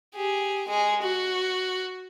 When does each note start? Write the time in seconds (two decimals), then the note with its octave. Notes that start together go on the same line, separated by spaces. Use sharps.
0.15 G4 G#4
0.68 G#3 G#4
1.02 F#4